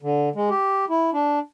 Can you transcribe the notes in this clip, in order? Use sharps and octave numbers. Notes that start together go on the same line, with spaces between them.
D3
G#3
G4
E4
D4